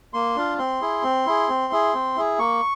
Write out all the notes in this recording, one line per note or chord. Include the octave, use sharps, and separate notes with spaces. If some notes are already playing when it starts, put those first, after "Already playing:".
A#3 C6
D4 F4
C4 C6
E4 G#4
C4
E4 G#4
C4
E4 G#4
C4
E4 G#4
A#3 C#6